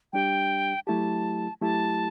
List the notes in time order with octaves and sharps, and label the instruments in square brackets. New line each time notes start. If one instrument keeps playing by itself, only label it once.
[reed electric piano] G3 D4 G4 [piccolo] G5
[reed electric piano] F#3 A3 E4 G4 [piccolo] A5
[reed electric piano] F#3 A3 E4 G4 [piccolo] A5